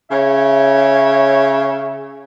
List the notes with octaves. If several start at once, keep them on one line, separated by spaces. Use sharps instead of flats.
C#3 C#5 E5